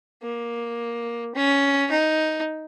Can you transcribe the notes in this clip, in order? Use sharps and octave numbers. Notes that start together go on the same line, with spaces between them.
A#3
C#4
D#4